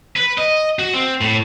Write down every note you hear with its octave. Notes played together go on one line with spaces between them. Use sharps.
B4
D#5
F#4
C4
A2